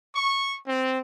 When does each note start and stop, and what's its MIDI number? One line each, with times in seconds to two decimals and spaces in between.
0.15 0.57 85
0.67 1.00 60